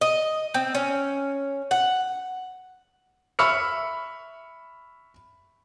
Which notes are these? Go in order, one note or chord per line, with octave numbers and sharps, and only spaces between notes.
D#5
C4
C#4
F#5
E5 B5 C#6 E6 F6 C#7